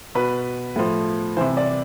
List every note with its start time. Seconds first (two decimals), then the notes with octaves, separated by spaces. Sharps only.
0.15 B2 B4
0.76 A2 F3
1.37 C3 E3 C5
1.57 D5